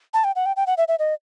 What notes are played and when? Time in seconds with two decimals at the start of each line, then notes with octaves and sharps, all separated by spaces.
0.14 A5
0.24 G5
0.36 F#5
0.46 G5
0.56 G5
0.67 F#5
0.77 E5
0.88 E5
0.99 D#5